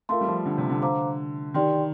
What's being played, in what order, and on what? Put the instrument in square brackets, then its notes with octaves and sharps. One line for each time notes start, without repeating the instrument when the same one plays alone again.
[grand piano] A3 [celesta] F4 A#4 F5 C6
[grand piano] G3
F3
D3
C3
D3
[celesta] C5 F5 A#5 D6
[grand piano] D#3 [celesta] G4 D5 G5 C6